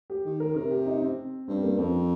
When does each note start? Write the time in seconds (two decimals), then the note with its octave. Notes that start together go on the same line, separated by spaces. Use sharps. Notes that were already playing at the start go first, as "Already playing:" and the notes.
0.10 G4
0.25 D#3
0.40 A#4
0.55 C3 A#4
0.71 G4
0.86 D#4
1.02 C4
1.48 G2 C4
1.63 A#3
1.78 F2 C4